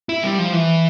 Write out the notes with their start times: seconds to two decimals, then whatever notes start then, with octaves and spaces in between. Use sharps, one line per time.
0.09 E4
0.23 G3
0.39 F3
0.53 E3